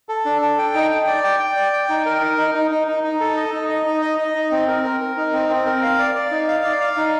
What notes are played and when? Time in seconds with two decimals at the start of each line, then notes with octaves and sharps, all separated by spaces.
0.09 A4
0.25 D4
0.42 A4
0.58 G5
0.74 D#4
0.91 G5
1.07 D5
1.23 G5
1.40 G5
1.56 D5
1.73 G5
1.89 D#4
2.06 A#4
2.22 D#4
2.38 D#4
2.55 D#4
2.71 D#4
2.87 D#4
3.04 D#4
3.20 A4
3.37 D#5
3.53 D#4
3.69 D#5
3.86 D#4
4.02 D#5
4.18 D#5
4.35 D#4
4.51 C4
4.68 A#4
4.84 A#4
5.00 A#4
5.17 D#4
5.33 C4
5.49 C4
5.66 A#4
5.82 F5
5.99 D5
6.15 D5
6.31 D#4
6.48 F5
6.64 D5
6.80 F5
6.97 D#4